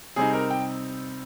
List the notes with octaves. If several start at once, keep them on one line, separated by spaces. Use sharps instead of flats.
C3 G3 C4 D#4 G#4
A#4
G5